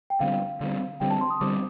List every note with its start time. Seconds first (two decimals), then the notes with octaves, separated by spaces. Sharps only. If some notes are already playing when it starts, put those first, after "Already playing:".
0.10 G5
0.20 D3 G3 C4 F5
0.61 D3 G3 C4
1.00 D3 G3 C4 G5
1.10 A5
1.21 C6
1.30 D#6
1.41 D3 G3 C4 D6